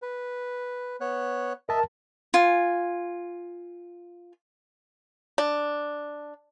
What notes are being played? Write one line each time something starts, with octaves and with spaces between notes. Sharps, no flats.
B4
B3 C#5 F#6
A#4 D#5 E5 A5
F4 G#5
D4